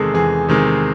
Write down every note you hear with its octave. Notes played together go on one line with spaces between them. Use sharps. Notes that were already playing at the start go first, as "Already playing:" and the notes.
Already playing: E2 C3 D#3 G#3 G#4 A4
E2 G#4
C3 D#3 G#3